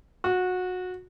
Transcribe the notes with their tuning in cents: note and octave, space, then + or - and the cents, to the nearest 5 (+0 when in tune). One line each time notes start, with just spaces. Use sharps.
F#4 -20